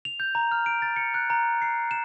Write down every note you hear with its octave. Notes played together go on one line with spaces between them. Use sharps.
F7
G6
A#5
F6
D7
A6
C#7
F#6
A#5
C7
E7